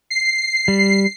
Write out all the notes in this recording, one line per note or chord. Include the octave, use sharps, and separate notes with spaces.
C7
G3